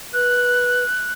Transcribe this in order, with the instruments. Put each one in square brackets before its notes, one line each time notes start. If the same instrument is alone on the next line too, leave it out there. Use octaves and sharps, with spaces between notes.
[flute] B4 [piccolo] F#6